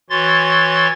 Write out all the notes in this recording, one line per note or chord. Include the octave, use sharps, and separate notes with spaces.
E3 F#4 C#5 C6 A6